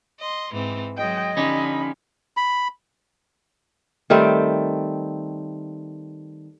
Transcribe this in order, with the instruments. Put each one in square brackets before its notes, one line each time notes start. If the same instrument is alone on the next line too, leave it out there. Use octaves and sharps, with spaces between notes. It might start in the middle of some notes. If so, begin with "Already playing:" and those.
[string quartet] D#5 C6
G#2 E3 C4
[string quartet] F#3 G#3 [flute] D#5 [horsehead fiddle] G5
[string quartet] D3 F3 [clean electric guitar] C#4 D#4 G4 [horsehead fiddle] B5
[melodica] B5
[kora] D#3 G3 A3 C4